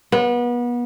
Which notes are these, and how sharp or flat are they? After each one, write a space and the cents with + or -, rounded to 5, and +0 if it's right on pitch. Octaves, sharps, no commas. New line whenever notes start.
B3 -30